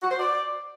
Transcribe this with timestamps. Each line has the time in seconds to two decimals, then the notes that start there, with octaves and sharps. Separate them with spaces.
0.03 F#4
0.11 C5
0.19 D5